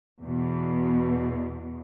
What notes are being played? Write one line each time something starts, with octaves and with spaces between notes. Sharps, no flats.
E2 B2